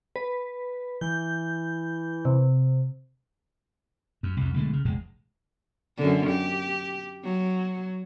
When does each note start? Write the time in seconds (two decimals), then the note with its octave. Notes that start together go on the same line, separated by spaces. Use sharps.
0.16 B4
1.01 E3 G6
2.25 C3
4.23 F#2
4.37 C2 F2
4.54 B1 D3 G#3 A3
4.73 C#3
4.85 E1 A#1 A2 G#3
5.98 F#2 D3
6.30 G4
7.25 F#3